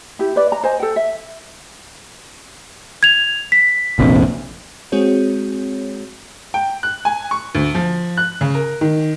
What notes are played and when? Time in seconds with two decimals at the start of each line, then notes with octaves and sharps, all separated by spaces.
0.19 E4 G4
0.36 B4 D5
0.52 A#5
0.63 C5 D#5 G#5
0.80 A4 G5
0.96 E5
3.03 G#6 F7
3.52 B6
3.99 F1 A#1 F2
4.92 G#3 C4 F#4 G#4 C#5
6.54 G5
6.83 F#6
7.05 G#5
7.31 C#6
7.55 D2
7.75 F3
8.17 F#6
8.41 C#3
8.55 A#4
8.81 D#3